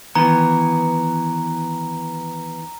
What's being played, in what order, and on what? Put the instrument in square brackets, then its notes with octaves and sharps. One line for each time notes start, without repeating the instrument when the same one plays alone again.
[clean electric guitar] D#3 E3 B3 [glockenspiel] A#5